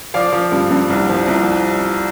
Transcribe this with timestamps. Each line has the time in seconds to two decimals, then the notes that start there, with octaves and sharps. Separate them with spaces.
0.14 F3 D5 F5
0.33 F3
0.52 G2
0.71 G2
0.90 C2
1.09 F3
1.28 C2